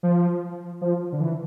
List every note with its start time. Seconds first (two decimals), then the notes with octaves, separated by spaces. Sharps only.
0.03 F3
0.81 F3
1.12 D3
1.21 E3